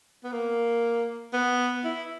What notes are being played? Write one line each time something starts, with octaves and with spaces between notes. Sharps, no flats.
B3
A#3
B3
E4